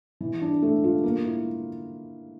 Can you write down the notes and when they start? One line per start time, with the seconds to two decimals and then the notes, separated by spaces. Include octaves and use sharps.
0.21 E3
0.42 D4
0.62 A3
0.84 F4
1.03 A#3
1.25 E4